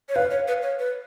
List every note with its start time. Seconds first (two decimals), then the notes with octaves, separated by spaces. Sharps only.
0.09 C#5
0.15 B4 F5
0.31 C#5
0.48 B4
0.62 C#5
0.79 B4